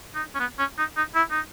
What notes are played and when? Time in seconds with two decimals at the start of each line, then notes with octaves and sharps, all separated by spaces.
0.15 D#4
0.35 C#4
0.40 B3
0.59 C#4
0.78 D#4
0.97 D#4
1.15 E4
1.31 D#4